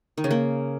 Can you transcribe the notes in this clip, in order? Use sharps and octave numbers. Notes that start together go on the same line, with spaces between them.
D#3
C#3
A#3